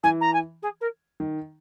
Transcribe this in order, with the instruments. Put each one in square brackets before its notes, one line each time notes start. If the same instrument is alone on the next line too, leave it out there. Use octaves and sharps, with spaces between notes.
[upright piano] E3 [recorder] G#5
[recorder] A#5
G#5
G#4
A#4
[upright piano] D#3